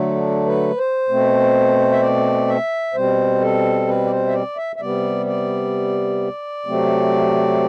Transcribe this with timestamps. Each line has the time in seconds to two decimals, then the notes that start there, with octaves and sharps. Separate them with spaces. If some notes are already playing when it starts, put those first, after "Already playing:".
Already playing: D3 F#3 A3
0.15 D4
0.46 B4
0.78 C5
1.09 B2 A3 C4
1.92 E5
2.01 D5
2.47 E5
2.94 B2 G3 C4 C5
3.41 A4
3.88 B4
4.06 D5
4.11 C5
4.27 E5
4.33 D5
4.57 E5
4.76 E5
4.80 C3 G3 B3 D5
5.26 D5
6.66 C3 F#3 A3 C4